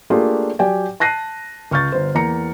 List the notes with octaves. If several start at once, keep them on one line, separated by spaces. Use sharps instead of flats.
A3 A#3 D4 F4 G4 G#4
F#3 G4 D5 G5 G#5
A5 F#6 A#6 C7 D#7
C#2 C#6 F6 G6 A6
G1 C5
E2 A#3 A#5 C#7